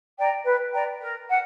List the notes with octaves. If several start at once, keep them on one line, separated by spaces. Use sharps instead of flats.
D5 G5 A#5
B4
D5 G5 A#5
A#4
F#5